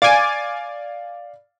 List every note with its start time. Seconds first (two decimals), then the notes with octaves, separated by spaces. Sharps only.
0.02 D5 F5 G#5 D6 A6